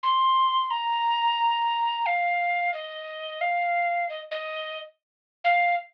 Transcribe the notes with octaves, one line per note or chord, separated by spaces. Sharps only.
C6
A#5
F5
D#5
F5
D#5
D#5
F5